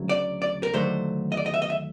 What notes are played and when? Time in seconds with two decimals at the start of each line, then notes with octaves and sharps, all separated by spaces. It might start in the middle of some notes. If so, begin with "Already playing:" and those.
Already playing: D2 C#3 F#3
0.09 D5
0.42 D5
0.63 A#4
0.73 D#2 D3 F#3 A3 C5
1.32 D#5
1.37 D5
1.46 D#5
1.54 E5
1.62 D#5
1.70 E5